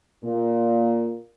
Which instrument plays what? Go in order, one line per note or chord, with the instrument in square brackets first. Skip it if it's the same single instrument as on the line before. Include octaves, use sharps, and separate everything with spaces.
[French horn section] A#2